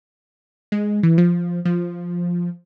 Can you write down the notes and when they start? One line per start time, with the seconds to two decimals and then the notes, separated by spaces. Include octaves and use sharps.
0.72 G#3
1.03 E3
1.18 F3
1.65 F3